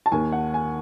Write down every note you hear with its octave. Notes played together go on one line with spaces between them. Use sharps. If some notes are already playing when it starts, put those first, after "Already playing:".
A5
D#2 D#3 G#5
F#5
G#5